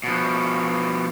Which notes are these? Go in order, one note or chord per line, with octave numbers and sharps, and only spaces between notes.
B2 F3